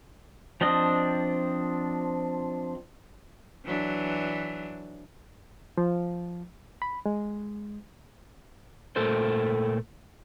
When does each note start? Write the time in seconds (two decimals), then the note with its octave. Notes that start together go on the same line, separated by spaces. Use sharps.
0.61 F3 C4 D4 D#5
3.65 E3 F#3 D4
5.78 F3
6.82 B5
7.06 G#3
8.96 A#2 A3 A4 A#4 C5